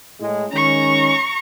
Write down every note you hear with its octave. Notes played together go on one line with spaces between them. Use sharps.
A2 G#3
D#3 G#3 C#4 A#5 C#6